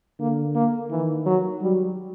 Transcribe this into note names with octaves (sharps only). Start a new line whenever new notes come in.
D3 A#3
A#3
D#3 E3
F#3
F#3 G3